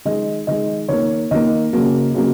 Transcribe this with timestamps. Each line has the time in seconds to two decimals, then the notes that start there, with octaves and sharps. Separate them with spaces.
0.05 D#3 G#3 D#5
0.47 D#3 G#3 D#5
0.89 D#3 A#3 C#5
1.31 D#3 A#3 D#5
1.73 C#3 F#3 A#3
2.14 C#3 F#3 A#3